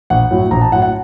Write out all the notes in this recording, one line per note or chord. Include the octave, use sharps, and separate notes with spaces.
A#1 F#5
A2 F#3
A#1 A#5
A5
A2 F#3 F#5
F#5